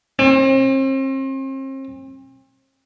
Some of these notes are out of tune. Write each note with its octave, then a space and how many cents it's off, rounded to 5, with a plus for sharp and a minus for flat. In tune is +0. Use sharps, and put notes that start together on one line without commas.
C4 +40